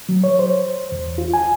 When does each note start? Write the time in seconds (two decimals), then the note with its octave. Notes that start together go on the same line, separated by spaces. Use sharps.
0.09 F#3
0.24 C#5
0.39 C5
0.92 E2
1.18 F4
1.34 G#5